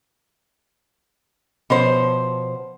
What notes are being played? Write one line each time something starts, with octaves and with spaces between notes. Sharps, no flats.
B2 F3 C5 C#5